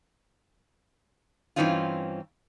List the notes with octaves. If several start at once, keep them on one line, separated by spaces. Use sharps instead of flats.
G2 E3 C4 C#4 D#4 F4